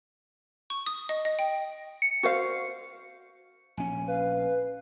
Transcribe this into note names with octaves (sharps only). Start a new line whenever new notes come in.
C#6
D#6
D#5
D#5
G5
C#7
F#4 C5 F5
A#1 C#4 G#5
B4 F5